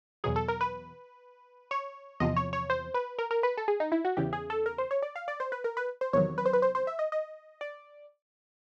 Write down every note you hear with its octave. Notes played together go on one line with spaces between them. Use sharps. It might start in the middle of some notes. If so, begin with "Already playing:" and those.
E2 B2 F#3 G#4
A4
A#4
B4
C#5
E2 C3 F3 D#5
C#5
C#5
C5
B4
A#4
A#4
B4
A4
G#4
D#4
E4
F#4
E2 C#3 E3 G4
G#4
A4
A#4
C5
C#5
D5
F5
D5
C5
B4
A#4
B4
C5
E2 C3 D#3 F#3 C#5
B4
C5
B4
C5
C5
E5
D#5
D#5
D5